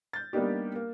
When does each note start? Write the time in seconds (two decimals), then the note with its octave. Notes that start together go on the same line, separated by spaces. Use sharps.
0.13 G6 A6
0.33 G3 A#3 B3 D4 D#4 G4
0.75 A#3